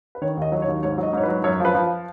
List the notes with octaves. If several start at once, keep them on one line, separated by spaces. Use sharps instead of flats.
B4
D#3 C#5
D#2 D#5
F#3
C#5
D#2
G#2 C#5
F#3
D#5
G#2 C#5
F#3 B4
F#2 C#5
F3
B4
F3